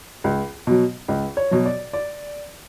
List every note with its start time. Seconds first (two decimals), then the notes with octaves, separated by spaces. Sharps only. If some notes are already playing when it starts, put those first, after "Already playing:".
0.24 C#2
0.67 B2 F#3
1.08 C#2
1.37 C#5
1.51 B2 F#3
1.65 D5
1.93 D5